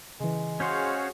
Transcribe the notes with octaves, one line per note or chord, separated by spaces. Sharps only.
C#3 E3 G#3
C#4 F#4 G#4 C5 C#5 F5 C6 G6